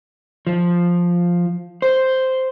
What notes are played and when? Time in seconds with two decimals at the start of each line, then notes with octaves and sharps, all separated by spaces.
0.47 F3
1.82 C5